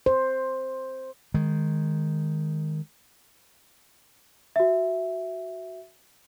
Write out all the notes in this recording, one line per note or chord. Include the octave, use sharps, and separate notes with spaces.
C5
D#3 G#3
F#4 E5